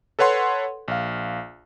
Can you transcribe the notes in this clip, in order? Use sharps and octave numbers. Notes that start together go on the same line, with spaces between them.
A4 B4 C#5 F#5 C6
A#1 F5